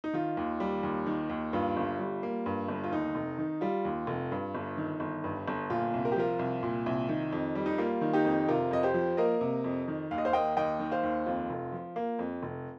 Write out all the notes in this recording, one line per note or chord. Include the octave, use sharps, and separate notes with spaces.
D#4
D#3 F4
D#2
G3
D#2
D#3
D#2
G2 F4
G1
G3
A#3
G2
G1
F4
D#2 D#4
F1
D#3
G3 F4
D#2
F1
G2
G1
D#3
G1
G2
G1
A#2 F4
C2
A#4
G4
F3 F4 A#4
C2
A#2
C2
D#3
F2
G3
D#4
A#3 F4
D#3
D#4 G4
F2
C3 F4 A#4
F2 D#5
G4 C5
F3
A#3 A#4 D#5
C3
F2
D#3
D#2 F5
D#5
C5 F5
A#3 D#5 G5
D#2 D#5 G5
D#3
C5 F5
D#2
F2 F4
F1
F3
A#3
F2
F1